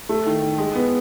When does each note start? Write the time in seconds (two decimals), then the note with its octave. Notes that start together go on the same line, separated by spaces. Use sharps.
0.09 A3
0.26 D#3
0.42 D#3
0.58 G#3
0.75 B3